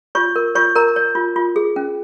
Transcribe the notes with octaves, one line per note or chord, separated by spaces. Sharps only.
F4 C#5 C#6
A#4
F4 C#5 C#6
A#4 C#5 A#5
C#5
F4
F4
G#4
C#4